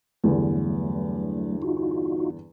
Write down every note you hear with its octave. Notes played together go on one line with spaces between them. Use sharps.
E2 G2 D3 F#3 A3
D#4 F4 F#4